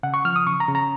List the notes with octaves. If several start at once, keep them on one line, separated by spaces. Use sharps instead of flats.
C#3 F#5
C#6
F3 F6
D#6
C#3 C#6
A#5
C#3
A#5